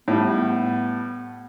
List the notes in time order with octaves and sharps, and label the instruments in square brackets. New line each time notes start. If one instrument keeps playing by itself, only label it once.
[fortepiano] A2 G3 [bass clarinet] B3